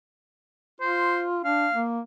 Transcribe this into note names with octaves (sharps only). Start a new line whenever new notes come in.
F4 C5
D4 F5
A#3